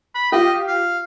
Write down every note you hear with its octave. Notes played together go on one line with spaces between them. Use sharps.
B5
F4 G4 D#5
F5